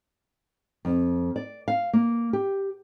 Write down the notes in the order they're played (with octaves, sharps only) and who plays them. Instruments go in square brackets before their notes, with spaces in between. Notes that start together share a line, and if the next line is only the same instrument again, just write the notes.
[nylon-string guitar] F2
D5
F5
A#3
G4